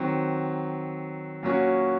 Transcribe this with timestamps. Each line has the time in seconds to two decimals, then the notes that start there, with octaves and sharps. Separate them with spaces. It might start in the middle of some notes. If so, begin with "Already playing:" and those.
Already playing: D#3 F#3 C4
1.43 A#2 F#3 C#4 F#4